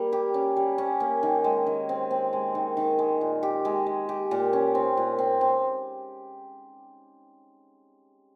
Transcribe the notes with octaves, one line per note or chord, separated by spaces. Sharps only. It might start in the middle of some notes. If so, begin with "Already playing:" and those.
Already playing: G3 A#3
G4
C#4
G3
C#4
A#3
D#3
G#3
D#3
C4
C4
G#3
D#3
D#3
G#3
A#2
G4
G#3
G#3
G4
A#2
C#4
C4
A#2
C4
C4